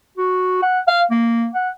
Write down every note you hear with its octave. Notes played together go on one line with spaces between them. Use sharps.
F#4
F#5
F5
A#3
F#5